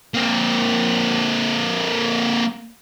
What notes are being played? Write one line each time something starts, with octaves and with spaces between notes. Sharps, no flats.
A#3 C4